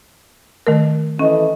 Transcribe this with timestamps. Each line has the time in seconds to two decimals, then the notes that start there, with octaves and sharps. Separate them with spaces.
0.67 D#3 A3 A#4
1.19 E3 C#4 A4 D#5